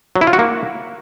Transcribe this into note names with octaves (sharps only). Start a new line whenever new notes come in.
F#3
E4
F4
F#4
A#3